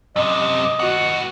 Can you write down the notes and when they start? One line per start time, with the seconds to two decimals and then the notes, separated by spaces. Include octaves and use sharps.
0.16 F#2 C3 D#5
0.80 A2 F#4 F#5